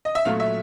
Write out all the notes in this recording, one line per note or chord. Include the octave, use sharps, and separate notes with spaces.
D#5
E5
A#2 F#3 A3 F5
E5